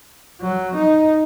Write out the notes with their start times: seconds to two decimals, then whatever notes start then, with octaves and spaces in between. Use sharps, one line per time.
0.41 F#3
0.76 D#4